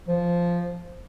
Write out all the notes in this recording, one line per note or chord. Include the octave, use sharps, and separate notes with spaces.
F3